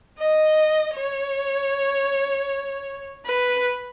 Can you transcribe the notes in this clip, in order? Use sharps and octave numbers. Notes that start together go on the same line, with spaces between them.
D#5
C#5
B4